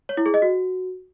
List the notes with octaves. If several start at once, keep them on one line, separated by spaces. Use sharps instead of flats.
C#5
E4
G#4
D#5
F#4